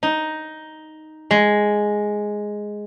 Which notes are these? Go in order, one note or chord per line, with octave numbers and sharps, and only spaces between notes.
D#4
G#3